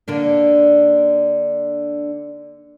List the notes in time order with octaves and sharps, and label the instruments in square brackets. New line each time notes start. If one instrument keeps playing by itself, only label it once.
[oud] D3 A#3 D4